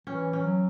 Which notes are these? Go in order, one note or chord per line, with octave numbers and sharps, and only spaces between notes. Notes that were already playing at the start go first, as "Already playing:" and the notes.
E3 C#4
C#4
F#3